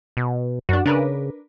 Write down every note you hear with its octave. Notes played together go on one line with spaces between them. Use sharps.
B2
F#2 D4 F#4
C#3 D4 A#4 B4